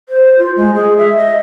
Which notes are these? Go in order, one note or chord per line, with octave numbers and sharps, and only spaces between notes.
C5
F4
G#3
G#4
E5
D#5